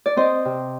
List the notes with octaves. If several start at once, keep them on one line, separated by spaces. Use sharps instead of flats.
D5
C4 C5 D#5
C3